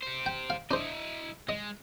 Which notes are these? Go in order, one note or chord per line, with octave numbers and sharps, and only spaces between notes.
G4 C5
G5
F5
D4 E4 C5 D#5
G#3 D#5